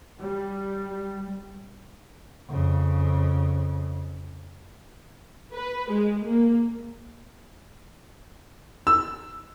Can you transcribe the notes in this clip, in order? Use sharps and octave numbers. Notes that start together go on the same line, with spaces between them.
G3
F2 C#3
B4
G#3
A#3
E6